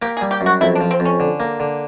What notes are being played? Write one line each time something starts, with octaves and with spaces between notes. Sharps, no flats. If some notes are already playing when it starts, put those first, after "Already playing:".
A#3 G4
G#4
G3
G4
F#2
F#4
F2 E4
D4
F3
C4
F2
C#4
D3
A#3
D3